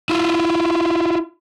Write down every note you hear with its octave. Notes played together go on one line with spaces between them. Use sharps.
E4 F4